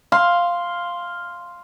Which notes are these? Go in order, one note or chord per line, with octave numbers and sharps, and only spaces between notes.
F5 C6